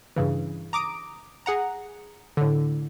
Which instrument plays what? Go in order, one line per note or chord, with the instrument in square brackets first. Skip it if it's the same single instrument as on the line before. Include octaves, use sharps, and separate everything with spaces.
[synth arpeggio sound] G2 C#3 E3
A#5 D6 D#6 D7
G#4 F#5 A#5
A2 D3